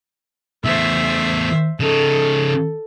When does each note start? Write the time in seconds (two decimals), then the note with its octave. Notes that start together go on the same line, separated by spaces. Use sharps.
0.64 E2 A3 C5 E5
1.80 C#3 D#4 A4